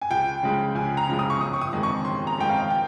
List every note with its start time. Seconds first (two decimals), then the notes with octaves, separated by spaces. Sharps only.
0.02 G#5
0.11 C#2 G5
0.43 C#3 F3 G#3
0.75 C#2 G#5
0.97 A#5
1.09 C#3 F3 G#3
1.19 D#6
1.30 C#6
1.40 G1 D#6
1.53 C#6
1.61 D#6
1.73 F2 D#3 G#3
1.83 C#6
2.05 G1 C6
2.27 A#5
2.38 F2 D#3 G#3 G5
2.49 F5
2.70 G5